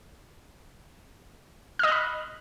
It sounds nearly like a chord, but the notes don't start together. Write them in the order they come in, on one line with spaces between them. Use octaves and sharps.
F6 D#5 F#6 B5